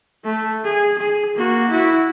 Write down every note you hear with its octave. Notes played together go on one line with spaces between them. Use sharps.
A3
G#4
G#4
A#3 F#4
E4 F#4